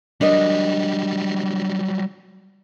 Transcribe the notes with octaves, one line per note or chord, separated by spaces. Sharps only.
F#3 G3 D4 A#4 D#5